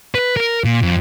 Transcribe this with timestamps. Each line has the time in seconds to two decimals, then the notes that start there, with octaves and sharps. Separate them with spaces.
0.15 B4
0.37 A#4
0.64 A#2
0.82 F2